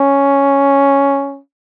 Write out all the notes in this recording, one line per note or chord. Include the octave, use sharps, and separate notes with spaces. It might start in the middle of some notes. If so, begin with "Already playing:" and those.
Already playing: C#4